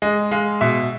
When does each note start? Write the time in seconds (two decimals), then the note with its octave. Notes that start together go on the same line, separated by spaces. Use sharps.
0.02 G#3 D#5
0.31 G#3 F5
0.61 B2 E5